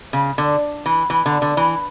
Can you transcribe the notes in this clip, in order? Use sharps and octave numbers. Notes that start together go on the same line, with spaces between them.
C#3
D3
E3
E3
D3
D3
E3